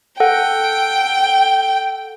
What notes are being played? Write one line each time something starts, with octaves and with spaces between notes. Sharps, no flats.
A4 F#5 G5